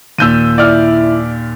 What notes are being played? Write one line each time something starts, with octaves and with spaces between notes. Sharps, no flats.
D#2 A#2 E6 G6 D#7
E4 D5 F6